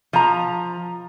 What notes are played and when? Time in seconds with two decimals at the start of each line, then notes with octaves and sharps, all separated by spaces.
0.13 F3 A#5